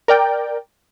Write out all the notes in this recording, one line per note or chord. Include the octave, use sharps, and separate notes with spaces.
A#4 D5 G5